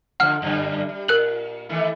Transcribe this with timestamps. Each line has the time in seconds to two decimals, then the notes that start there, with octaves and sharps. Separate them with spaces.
0.20 D3 F3 F#5 F6
0.42 F#2 D3 G3
0.89 G3
1.08 A#2 A#4 F#6 F#7
1.69 D#3 E3 A3